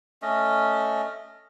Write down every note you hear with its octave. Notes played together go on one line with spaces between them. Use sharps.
A3 C#4 D#5